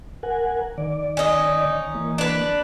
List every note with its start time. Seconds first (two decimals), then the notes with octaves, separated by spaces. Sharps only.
0.23 A#4 F#5 G#5
0.78 D#3 D5
1.17 C#4 D#4
1.95 E3 A#3
2.18 D4 B4